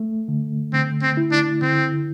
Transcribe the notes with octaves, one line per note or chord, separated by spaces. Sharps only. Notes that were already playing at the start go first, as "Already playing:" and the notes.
Already playing: A3
D3
D3 C4
C4
E4
D4
D3 C4